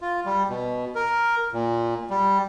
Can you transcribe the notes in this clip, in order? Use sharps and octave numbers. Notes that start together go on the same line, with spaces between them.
F4
G3
B2
A#4
A#2
G3